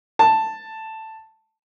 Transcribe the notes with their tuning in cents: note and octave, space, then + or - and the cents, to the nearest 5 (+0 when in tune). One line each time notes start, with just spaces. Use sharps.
A5 +5